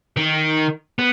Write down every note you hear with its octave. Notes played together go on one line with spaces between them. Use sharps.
D#3
B3